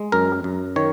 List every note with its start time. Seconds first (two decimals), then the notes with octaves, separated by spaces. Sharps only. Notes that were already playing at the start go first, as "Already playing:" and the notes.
Already playing: G#3
0.12 F#2 A#4
0.44 F#2
0.76 D#3 C#5